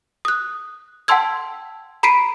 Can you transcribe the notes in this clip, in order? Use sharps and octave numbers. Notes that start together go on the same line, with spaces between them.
D#6 F#6
F#5 G5 A5 C6 E6 G#6
A#5 B5 B6 C7 D7 D#7